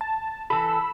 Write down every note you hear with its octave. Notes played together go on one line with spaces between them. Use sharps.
A5
E3 A4 B5 E6